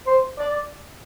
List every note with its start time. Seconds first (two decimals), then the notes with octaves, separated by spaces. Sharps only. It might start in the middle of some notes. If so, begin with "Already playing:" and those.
0.07 C5
0.39 D5